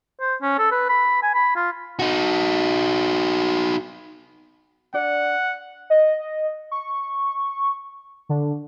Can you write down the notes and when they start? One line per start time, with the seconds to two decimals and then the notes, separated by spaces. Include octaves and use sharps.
0.21 C5
0.42 C#4
0.58 A4
0.71 B4
0.89 B5
1.23 G#5
1.35 B5
1.56 F4
1.99 D#4 F#4
4.94 D4 D5 F#5
5.90 D#5
6.72 C#6
8.29 D3